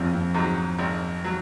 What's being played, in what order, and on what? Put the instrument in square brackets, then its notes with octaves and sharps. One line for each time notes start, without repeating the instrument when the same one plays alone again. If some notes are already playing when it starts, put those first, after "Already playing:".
Already playing: [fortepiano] G#1 [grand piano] F2
[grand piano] F2
[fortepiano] G#2 F#3
G#1
F#3